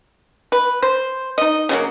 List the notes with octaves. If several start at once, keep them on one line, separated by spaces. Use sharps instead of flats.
B4
C5
D#4 D#5
C#3 F#3 A#3